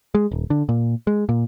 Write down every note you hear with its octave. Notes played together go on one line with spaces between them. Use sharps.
G#3
D#1
D3
A#2
G#3
A#2